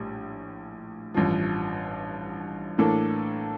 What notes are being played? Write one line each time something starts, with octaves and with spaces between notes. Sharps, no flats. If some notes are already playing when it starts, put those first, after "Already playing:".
Already playing: A#1 A2 G3
A1 G2 F3
A2 E3 A#3 D4 A4